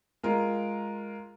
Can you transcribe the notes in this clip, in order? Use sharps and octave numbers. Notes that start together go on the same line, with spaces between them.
G#3 F4 A#4